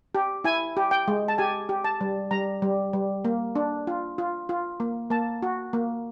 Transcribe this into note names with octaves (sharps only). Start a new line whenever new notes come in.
G4
E4 G#5
G4
G5
G#3
A5
G4 G#5
G4
A5
G3
G3 A#5
G3
G3
A#3
D4
F4
F4
F4
A#3
A#3 A5
F#4
A#3